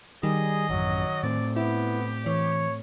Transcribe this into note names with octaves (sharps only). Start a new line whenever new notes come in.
D#3 G3 G#4 D#5
A1 F#2 F#3
A2 C4 D5
B3 E4 G4
E3 C#5